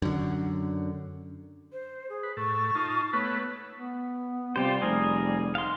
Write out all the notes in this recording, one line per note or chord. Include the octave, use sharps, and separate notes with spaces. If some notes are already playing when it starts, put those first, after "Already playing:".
F#2 D3
C5
G#4
B4
A2 A4 C#6
D#4 F4 A5
A3 B3 B4 C#5
B3
C3 G3 F4 G4 C5
F1 G#4 A#4
D#4 F5 C6